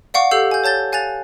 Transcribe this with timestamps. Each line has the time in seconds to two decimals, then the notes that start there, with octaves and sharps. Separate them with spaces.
0.14 D5 F5 F#5 C#6 D6
0.31 G4 A4 F#5 E6 G6 C7
0.51 G#5 G6
0.64 C#5 A5 G6 A6 G7
0.92 F5 G#5 F#6 A6 F7